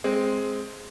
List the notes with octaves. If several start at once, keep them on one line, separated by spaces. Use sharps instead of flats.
G#3 C4